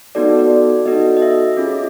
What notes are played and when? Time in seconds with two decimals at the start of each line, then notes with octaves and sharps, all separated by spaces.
0.15 B3 D#4 F#4 A4 D5
0.38 D5
0.85 B3 D#4 F#4 A4 D#5
1.17 D#5
1.22 E5
1.57 C#4 F4 G#4